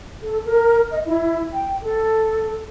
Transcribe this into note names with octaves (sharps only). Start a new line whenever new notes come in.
A4
A#4
D#5
E4
G5
A4